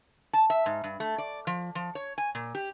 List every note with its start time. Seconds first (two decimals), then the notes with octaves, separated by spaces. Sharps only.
0.33 A5
0.50 E5
0.66 G#2
0.84 G2
1.00 A3
1.18 D5
1.47 F3
1.75 F3
1.95 C#5
2.18 G#5
2.35 A#2
2.55 G4